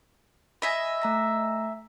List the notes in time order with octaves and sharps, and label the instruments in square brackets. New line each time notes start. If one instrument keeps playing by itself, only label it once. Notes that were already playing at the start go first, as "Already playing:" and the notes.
[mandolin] D#5 E5 G#5 [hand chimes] B5
[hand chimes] A3 A#5 A#6